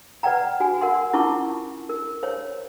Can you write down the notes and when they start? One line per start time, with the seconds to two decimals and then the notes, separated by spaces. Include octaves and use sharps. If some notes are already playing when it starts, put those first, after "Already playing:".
0.23 B4 D5 F#5 G5 A#5
0.60 F#4 G#5
0.81 A#4 F#5 C6
1.13 C#4 E4 F4 A5 C#6 D6
1.89 A#4
2.23 C5 C#5